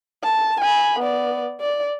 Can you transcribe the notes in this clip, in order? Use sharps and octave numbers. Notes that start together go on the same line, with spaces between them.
A5
G#5 B5
B3 D5
D5